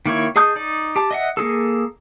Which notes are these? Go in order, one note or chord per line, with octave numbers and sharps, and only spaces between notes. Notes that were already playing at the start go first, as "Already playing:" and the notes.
D#3 A#3 E4 C#5
G#4 D#5 A5 D#6 G6
D#4 D5
G4 A5
D#5 E5 F#5
A#3 D#4 G#4 A4